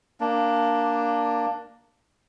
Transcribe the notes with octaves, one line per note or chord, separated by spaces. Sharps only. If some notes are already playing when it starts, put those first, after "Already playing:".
A#3 D4